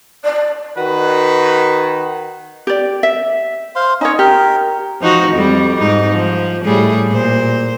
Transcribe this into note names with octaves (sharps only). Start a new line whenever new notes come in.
D5
D#3 F#4 B4
G4 D5
E5
C5 F5 C6
C#4 D#4 C#5 D#5
G4 A#4
F3 D#4 F#4
F2 G3
G#2 D#4
F3
A2 G3 G#4
A#2 C5